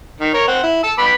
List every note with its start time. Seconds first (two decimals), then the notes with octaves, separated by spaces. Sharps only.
0.21 D#3
0.34 A#4 C#5
0.47 C4 F#5
0.64 E4
0.84 A5 E6
0.98 B3 B5 D6